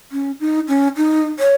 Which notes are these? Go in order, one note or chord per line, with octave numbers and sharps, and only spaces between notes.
C#4
D#4
C#4
D#4
C#5